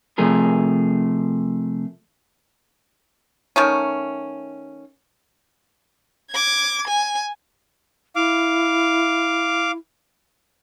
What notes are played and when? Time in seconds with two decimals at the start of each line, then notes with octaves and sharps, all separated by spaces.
0.18 C3 F3 A3 G#4 A#4
3.56 D#3 A3 C#4
6.31 D6 G#6
6.88 G#5
8.16 E4 F5 D6